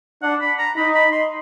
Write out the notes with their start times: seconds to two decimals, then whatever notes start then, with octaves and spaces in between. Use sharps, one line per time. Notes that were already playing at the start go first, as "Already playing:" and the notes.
0.23 D4 F#5
0.41 B5
0.59 A#5
0.77 D#4 B5
0.95 B5
1.12 C6